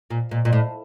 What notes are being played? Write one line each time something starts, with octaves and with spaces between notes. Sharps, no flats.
A#2
A#2
A#2
A2